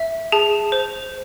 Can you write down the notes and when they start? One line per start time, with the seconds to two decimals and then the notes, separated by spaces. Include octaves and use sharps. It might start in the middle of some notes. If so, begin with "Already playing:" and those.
Already playing: E5
0.32 G#4 A5
0.72 C5